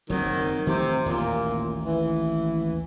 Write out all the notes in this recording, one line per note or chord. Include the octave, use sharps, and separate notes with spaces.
F#1 A#2 D#3 F#3 C4
C3 D#3 F#3 A3
A1 D#2 A#2
E3